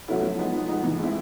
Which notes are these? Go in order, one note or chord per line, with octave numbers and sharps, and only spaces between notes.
F#3 A3 C#4 E4
F3
G#3 B3 D#4
F3
G#3 B3 D#4
E3
G#3 C4 E4